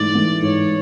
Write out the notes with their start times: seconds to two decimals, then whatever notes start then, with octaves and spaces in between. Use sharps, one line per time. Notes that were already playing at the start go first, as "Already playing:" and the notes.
Already playing: G#2 E3 A3 D5
0.15 E3 A3
0.42 G#2 C#5